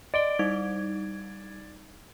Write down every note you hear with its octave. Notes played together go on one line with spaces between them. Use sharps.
D5 D#5 D7 G7
G3 D#4 G#6